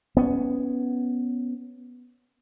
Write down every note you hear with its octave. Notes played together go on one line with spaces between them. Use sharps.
B3 C#4